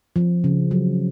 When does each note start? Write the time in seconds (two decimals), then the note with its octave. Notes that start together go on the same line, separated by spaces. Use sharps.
0.16 F3
0.44 C#3
0.71 F#3